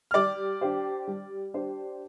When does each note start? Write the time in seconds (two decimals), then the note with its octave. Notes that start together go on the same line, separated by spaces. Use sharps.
0.11 F6
0.14 G3 D5 D6
0.61 D4 G4 C5
1.08 G3
1.54 D4 G4 C5